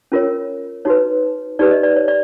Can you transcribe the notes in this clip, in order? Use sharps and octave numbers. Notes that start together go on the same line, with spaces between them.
C#4 F4 A#4 C#5
D#4 F#4 B4 C#5
D#4 G4 B4 D5
D#5
D5
C#5
D5